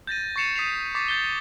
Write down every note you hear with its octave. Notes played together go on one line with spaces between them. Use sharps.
G6 A6 A#6 D#7
C#6 A6 C7 C#7 E7 F7
D#6 B6 C7 D#7 F7
C#6 D6 A6 B6 C7
G6 A6 C7 G7